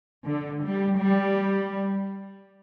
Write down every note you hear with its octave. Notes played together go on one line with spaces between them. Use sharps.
D3
G3
G3